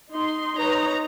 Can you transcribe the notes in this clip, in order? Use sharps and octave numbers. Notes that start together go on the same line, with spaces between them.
D#4 C6
D#4 B4 C#5 A#5